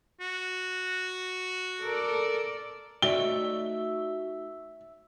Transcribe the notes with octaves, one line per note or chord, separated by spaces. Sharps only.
F#4
A4 A#4 D5
A3 D#4 F#4 C#5 D5 E5 G7